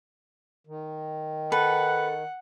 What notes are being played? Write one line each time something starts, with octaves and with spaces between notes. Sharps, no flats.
D#3
A4 B4 F#5